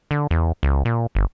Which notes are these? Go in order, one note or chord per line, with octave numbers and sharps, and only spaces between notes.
D3
E2
C#2
A#2
G1